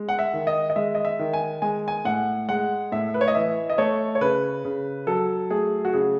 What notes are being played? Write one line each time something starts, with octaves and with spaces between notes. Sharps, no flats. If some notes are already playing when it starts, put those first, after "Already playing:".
Already playing: G#3
F#5
E5
D#3
D#5
D#5
G#3 E5
D#5
E5
D#3
G#5
G#3 G#5
G#5
A2 F#5
G#3 F#5
A2 E5
B4
C#5
D#5
E3 E5
D#5
A3 C#5
C#5
C#3 B4
C#3
F#3 A4
A3 G#4
F#4
C#3 G#4